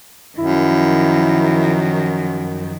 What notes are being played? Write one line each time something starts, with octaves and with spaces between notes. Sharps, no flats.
F#2 D#3 F3 E4